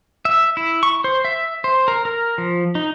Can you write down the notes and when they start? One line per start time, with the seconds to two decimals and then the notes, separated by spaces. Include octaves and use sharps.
0.25 E5
0.57 E4
0.83 C#6
1.04 C5
1.25 E5
1.64 C5
1.88 A#4
2.05 A#4
2.38 F3
2.75 D#4